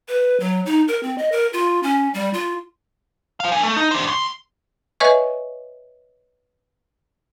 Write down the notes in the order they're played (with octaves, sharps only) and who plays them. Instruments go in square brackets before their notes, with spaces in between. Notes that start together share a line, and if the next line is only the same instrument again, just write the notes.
[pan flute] B4
F#3
D#4
A#4
C4
D#5
A#4
F4
C#4
G3
F4
[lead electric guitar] C5 F5
D4 G#5
A3
D#4
D4 C5
D2 C6
[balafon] B4 C#5 D#5 E5 G#5 C#6